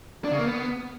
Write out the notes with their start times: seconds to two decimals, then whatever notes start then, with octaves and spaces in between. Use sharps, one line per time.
0.24 D4
0.31 C#3
0.39 A#3
0.46 B3